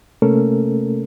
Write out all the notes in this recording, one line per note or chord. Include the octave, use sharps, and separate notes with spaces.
C3 A3 A#3 C#4 A4 A#4